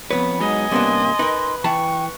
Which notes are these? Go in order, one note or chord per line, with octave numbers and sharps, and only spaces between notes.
F2 F3 B3 B4 C#5 B5
F#3 G#3 D#4 D#5 G#5
C3 G3 A#3 B3 C#4 D4 C6
D#4 A#4 B4
E3 G5 A5 B5 C#6